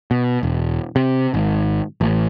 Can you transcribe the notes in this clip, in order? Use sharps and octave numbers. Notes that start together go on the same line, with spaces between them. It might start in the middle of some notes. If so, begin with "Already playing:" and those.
B2
E1
C3
G#1
A1